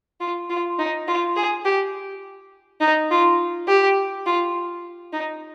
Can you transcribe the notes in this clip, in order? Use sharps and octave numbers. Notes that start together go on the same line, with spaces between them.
F4
F4
D#4
F4
G#4
G4
D#4
F4
G4
F4
D#4